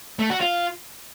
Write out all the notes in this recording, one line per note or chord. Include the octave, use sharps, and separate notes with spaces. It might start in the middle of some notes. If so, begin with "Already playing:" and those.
A3
F#4
F4